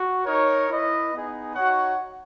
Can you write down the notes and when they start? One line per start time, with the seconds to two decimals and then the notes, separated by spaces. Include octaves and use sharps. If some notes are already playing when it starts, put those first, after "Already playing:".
Already playing: F#4
0.26 D#4 A#4 C#5
0.68 E4 B4 D#5
1.13 B3 D#4 G#4
1.55 D#4 F#4 C#5 F#5